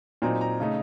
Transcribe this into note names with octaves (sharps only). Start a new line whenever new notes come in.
A#2 F#3 C4 D#4 A#5
A#5
C#3 A3 D#4